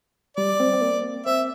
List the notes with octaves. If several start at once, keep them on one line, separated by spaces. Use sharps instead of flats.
G3 D5
C4
C4
A#3
C4 E5